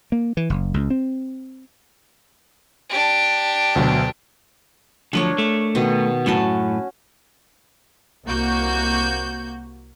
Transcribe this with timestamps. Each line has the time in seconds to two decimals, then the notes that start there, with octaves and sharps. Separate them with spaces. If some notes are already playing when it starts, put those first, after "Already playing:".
0.12 A#3
0.37 E3
0.50 F#1
0.74 C#2
0.90 C4
2.90 D4 G4
3.76 D2 B2 F#3
5.13 D2 F3 F#3 D4 A#4 C#5
5.38 A3
5.75 B2 D#3 D#5
6.26 F#2 A2 C#4 F#4 A5
8.25 C2 A#3 F#4 G6